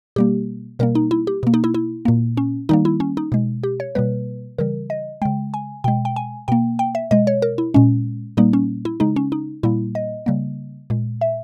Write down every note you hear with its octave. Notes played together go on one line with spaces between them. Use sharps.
B2 G3 A#3 G4
B2 G3 A#3 A#4
D#4
E4
G4
B2 A#3
D#4
E4
E4
A#2 A#3
C#4
D#3 G3 A#3 D#4
E4
C#4
D#4
B2 G#3
G4
C#5
B2 G3 A#3 B4
C#3 E3 G3 A#4
D#5
C#3 G#3 G5
G#5
B2 G#3 G5
G5
G#5
B2 A#3 G5
G5
E5
B2 G#3 D#5
C#5
A#4
E4
A#2 G#3 C#4
A#2 G3 A#3 D#4
C#4
E4
C#3 G#3 D#4
C#4
D#4
A#2 G3 A#3 E4
D#5
C#3 G3 A#3
A#2 G#3
E5